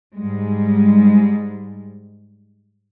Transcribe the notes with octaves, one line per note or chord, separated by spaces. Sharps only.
G#2 G3 G#3